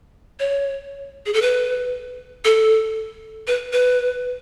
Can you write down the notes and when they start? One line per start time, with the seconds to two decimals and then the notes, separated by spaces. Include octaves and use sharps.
0.40 C#5
1.26 G#4
1.33 A4
1.42 B4
2.45 A4
3.47 B4
3.73 B4